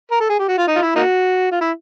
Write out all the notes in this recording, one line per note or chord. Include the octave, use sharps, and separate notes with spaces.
A#4
A4
G#4
G4
F#4
F4
D#4
F4
E4
A#3 D#4 F#4
F4
E4